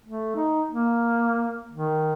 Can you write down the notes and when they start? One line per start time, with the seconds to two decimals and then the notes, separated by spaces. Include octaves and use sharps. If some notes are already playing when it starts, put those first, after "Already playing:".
0.05 A3
0.36 D#4
0.71 A#3
1.72 D#3